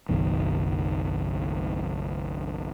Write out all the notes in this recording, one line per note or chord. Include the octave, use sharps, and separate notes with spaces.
F#1 B1 F#2 D#3